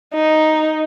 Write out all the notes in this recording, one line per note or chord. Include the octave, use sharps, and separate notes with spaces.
D#4